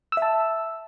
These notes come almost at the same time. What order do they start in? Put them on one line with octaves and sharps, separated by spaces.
E6 E5 A5